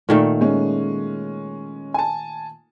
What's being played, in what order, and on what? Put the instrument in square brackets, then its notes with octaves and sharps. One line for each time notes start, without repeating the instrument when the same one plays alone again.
[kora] A#2 D#3 A3
[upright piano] G#3 C#4
G#5 A5